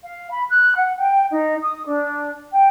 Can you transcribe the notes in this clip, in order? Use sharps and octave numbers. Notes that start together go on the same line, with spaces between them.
F5
B5
F#6
F#5
G5
D#4
D#6
D4
G5